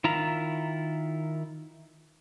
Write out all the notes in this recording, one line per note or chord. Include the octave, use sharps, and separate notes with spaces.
D#3 E4 F4 A#5